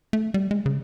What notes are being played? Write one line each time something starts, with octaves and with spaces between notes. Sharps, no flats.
A3
G3
G#3
C#3